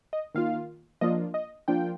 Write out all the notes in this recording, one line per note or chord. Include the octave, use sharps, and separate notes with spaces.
D#5
D#3 A#3 F4 F5
F3 A#3 D4 F4 D#5
D#5
F3 A#3 D4 F4 G5